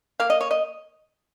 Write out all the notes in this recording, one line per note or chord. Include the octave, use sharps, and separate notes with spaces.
A#3 F5
D#5
C#5
D#5